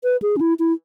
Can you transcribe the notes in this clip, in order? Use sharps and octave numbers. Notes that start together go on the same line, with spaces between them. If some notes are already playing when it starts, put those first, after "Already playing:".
B4
G#4
C#4
E4
E4